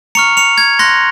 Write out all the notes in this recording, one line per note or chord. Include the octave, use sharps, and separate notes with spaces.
A#5 C#6 F6 C#7 F7
C#7 F7
G#6
C6 F#6 A#6